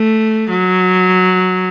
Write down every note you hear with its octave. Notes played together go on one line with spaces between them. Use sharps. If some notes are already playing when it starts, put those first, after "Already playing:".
Already playing: A3
F#3